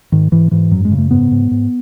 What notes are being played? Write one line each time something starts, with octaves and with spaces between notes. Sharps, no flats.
G#2 D#3
G#2 E3
G#2 E3
F#2 F#3
G#3
C#3
A3
G#2 B3
G#2
G#2